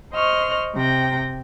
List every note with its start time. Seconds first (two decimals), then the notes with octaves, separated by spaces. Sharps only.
0.13 C5 D#5 C#6 F6
0.75 C3 G5 A#6